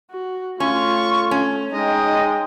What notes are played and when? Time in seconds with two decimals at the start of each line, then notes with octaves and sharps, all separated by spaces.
0.11 F#4
0.60 A3 C#4 F4 C#6
1.31 C#4
1.74 G#3 D#4 D#5 G5